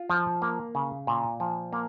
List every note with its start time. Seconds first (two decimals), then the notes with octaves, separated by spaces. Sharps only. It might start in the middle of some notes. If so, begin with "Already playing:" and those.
Already playing: F4
0.10 F3
0.42 A#3
0.75 C#3
1.07 A#2
1.40 F3
1.73 A#3